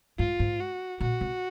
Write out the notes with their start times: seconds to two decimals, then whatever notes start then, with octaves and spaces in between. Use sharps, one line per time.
0.19 G#2 F4
0.40 G#2
0.60 F#4
1.00 A#2 F#4
1.21 C3